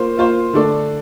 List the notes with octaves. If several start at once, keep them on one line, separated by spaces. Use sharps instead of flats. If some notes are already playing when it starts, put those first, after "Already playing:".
Already playing: A#3 F4 C5
A#3 F4 C5
D3 A3 D4 A4 D5